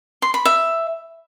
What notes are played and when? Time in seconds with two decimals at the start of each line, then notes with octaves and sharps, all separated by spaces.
0.22 C6
0.34 B5
0.45 E5